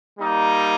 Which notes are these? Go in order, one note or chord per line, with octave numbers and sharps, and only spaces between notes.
G3 A#3 D#4